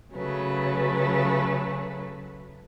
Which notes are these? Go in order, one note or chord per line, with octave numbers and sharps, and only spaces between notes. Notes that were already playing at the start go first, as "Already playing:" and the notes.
C#3 F#3 A3 B4